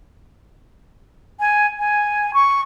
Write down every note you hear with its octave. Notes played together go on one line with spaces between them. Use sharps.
G#5
G#5
C#6